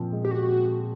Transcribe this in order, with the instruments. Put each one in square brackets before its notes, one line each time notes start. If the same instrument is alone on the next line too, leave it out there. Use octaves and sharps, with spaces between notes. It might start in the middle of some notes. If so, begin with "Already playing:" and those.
Already playing: [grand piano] A#2 F3 C4
G#3
[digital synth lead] G4
[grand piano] C4 [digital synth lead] F#4